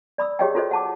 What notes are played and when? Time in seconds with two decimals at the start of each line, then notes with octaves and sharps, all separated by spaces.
0.18 D5 B5 D#6 E6
0.39 G4 G#4 C#5 D#5 F5 G5
0.55 F4 F#4 A4 C5 C#5 D#5
0.71 F#5 A5 D6